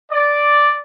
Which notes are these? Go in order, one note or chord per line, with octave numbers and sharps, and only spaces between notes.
D5